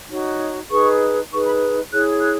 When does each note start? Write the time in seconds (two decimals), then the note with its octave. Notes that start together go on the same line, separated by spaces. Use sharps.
0.09 D#4 F#4 C#5
0.69 D#4 G#4 B4 C#6
1.31 D#4 G#4 B4 C#6
1.46 B5
1.92 E4 G#4 C#5 F#6
2.21 F#6